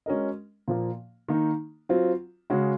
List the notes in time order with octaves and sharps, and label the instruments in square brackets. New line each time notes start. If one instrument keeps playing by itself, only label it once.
[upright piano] G#3 C#4 F#4 A#4 D#5
A#2 F3 A#3
D#3 A#3 D#4
F#3 C4 F4
C#3 G#3 C#4 F#4